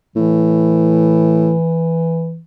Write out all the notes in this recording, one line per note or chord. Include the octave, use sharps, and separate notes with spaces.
A2 E3